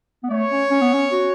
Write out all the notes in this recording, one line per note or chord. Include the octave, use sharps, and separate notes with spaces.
B3
A3 C#5
C#4
C#4
B3
C#4
F#4